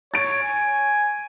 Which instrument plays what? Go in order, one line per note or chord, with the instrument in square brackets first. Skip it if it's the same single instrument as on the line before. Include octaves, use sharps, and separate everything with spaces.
[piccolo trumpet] C#5 [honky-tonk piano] A6 D7
[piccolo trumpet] G#5